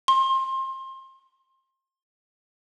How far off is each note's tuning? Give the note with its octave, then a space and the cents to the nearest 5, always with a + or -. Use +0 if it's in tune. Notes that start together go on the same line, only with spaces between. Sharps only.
C6 +25